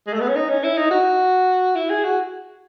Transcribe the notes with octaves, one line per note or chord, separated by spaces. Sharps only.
G#3
A3
B3
C#4
D#4
C#4
E4
D#4
F#4
E4
G#4
F#4